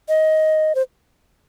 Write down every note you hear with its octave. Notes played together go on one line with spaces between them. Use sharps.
D#5
C5